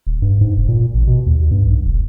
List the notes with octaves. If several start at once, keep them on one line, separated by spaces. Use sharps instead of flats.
D#1
G2
G#2
F1
A#2
A1
B2
D#2
G2
B1
E1